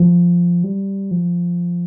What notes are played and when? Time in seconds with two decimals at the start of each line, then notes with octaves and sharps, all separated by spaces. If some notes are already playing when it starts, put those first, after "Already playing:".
Already playing: F3
0.64 G3
1.11 F3